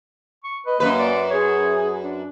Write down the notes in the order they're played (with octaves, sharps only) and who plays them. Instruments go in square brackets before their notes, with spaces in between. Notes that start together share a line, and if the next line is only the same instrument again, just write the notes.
[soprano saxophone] C#6
[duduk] B4 [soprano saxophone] D#5
[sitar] F#2 B4 [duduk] A#3
[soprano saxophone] D5
[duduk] G#4 [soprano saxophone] C#5
[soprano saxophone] D4